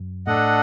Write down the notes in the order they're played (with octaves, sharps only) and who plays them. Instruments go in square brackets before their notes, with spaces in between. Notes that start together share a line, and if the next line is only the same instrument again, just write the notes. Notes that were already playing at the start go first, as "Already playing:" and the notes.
Already playing: [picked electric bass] F#2
[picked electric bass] A2 [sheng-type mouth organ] D4 A4 D#5 F#5